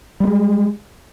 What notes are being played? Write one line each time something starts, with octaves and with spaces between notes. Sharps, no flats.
G3 G#3 A#3